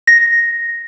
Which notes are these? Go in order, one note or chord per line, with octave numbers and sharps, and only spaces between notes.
A#6